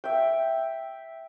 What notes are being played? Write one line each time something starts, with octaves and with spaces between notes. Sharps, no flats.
E5 G5